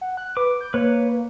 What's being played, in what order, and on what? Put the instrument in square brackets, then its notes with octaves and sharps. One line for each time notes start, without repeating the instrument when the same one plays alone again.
[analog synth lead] F#5
F#6
[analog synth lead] B4 [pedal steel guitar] D6
[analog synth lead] G6
[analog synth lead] A#3 [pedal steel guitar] B4 C#5